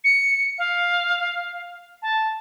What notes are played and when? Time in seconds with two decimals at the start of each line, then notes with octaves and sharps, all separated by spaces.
0.04 C#7
0.58 F5
2.02 A5